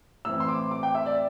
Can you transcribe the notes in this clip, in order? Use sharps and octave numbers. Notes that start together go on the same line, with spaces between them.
A2 E3 C4 E6
C6
D6
D6
G5
E5
D5